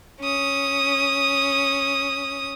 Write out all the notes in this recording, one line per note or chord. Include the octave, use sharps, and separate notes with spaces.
C#4 D#6